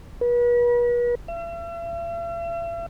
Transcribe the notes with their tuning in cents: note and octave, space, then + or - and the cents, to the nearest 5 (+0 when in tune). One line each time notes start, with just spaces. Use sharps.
B4 -40
E5 +45